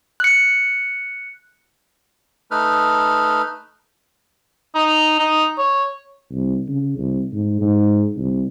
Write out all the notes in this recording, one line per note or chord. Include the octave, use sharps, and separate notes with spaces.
F#6 C#7
A3 D#4 B4 F6
D#4
D#4
C#5
C2
C#3
C2
G#2
G#2
C2